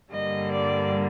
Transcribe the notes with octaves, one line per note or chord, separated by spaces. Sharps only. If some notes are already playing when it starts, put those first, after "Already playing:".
G2 D3 G3 A#3 D#5
D5